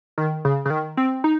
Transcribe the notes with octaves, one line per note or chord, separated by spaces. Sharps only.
D#3
C#3
C#3
D#3
C4
D#4